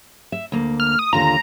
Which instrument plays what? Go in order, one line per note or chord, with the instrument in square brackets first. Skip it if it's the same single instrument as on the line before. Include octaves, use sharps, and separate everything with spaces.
[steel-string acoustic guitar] E5
D2 A#3
[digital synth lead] F6
D#6
[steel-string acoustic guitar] D#2 D3 F4 [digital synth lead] A#5